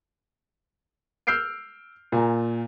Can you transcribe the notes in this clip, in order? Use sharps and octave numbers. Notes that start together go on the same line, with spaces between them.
E6 F6 G6 C7 D7
A#2 G#5 A#5